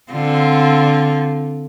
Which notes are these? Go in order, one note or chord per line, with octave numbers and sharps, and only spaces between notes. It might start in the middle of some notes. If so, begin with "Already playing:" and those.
D3 C4 F4